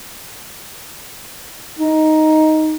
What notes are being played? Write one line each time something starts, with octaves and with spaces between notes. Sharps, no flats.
D#4